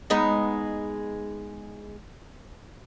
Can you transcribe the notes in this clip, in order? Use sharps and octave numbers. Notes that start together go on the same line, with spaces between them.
G#3 B3 D#4